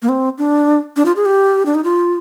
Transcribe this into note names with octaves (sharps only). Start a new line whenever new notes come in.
A#3
C4
D4
D4
F4
G#4
G4
D4
D#4
F4